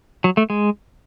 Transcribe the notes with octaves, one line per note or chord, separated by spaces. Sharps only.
F#3
A3
G#3